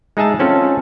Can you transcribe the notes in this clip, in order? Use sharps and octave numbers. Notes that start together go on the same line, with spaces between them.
G#3 D#4 G#4 E5 A5
C4 C#4 F4 A4